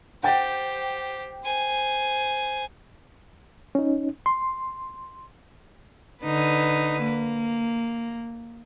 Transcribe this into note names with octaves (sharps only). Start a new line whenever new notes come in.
G4 C5 F#5 G5 A6
C5 G#5
C#4 D#4
C6
D3 D#4 B4
A#3